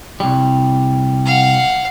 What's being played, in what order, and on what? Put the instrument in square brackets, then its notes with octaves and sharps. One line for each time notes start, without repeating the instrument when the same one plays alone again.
[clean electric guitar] C2 G3
[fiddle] F5 F#5